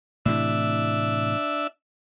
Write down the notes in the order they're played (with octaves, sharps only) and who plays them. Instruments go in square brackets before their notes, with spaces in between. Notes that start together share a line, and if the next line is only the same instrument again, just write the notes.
[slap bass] A2 C3 E3 [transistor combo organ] D4 E5 E6